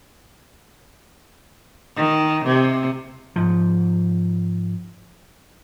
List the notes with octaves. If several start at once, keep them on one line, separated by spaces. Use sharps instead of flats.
D#3
C3
G#2 F3